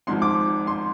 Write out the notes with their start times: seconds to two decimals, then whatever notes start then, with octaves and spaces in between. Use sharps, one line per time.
0.07 G#1 G#2 F3 C6
0.22 D6
0.67 C6